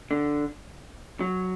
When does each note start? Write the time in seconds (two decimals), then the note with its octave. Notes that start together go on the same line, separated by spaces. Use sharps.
0.11 D3
1.21 F#3